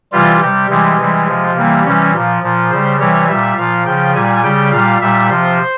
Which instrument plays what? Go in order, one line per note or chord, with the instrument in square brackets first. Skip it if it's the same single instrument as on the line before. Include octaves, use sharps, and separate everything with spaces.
[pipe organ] C3 E3 G3 F4
C3 G3 G4
C3 E3 G3 G#3
C3 E3 G3
C3 F3
C3 E3 G3 A#3
C3 E3 G3 C#4
A#2 F3
A#2 F3
C#3 G3 C5
C3 E3 G3 C#5
A#2 G3 E5
A#2 F3 F5
C#3 F3 G5
A#2 G3 G#5
C#3 G3 G5
A#2 G3 F5
A#2 G3 E5
C3 F3 C5